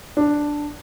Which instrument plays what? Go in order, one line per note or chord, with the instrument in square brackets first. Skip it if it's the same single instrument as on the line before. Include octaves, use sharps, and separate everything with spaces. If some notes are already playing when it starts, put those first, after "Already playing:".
[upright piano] D4